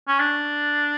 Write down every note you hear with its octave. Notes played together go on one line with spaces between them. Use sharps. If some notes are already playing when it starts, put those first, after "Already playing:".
C#4
D4